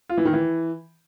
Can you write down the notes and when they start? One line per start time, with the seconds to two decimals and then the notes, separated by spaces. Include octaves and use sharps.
0.09 F4
0.17 E3
0.25 D#3
0.33 E3